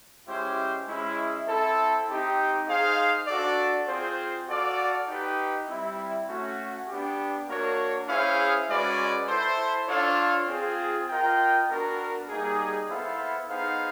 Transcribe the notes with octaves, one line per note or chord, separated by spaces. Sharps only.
G#3 C#4 E4 G4 C5
G#3 C#4 E4
C4 E4 A4
C4 D#4 G4
D#4 G#4 C5 F5
D4 F#4 A4 D5
C4 F4 G#4 C5
F#4 A4 D5 F5
D#4 G4 B4
G3 C4 E4
A3 C#4 F#4
B3 D4 G4
A#3 D4 F#4 A#4 C#5
C#4 E4 G#4 C5 F5
G#3 C#4 F#4 B4 D5
E4 A4 C5
D4 F4 A4 C#5 F5
C4 F4 G#4
F4 A#4 D#5 G5
B3 D4 F#4 A#4
G3 A#3 D#4 G#4
B3 E4 A4 C5 F5
B3 D#4 G#4 C5 F5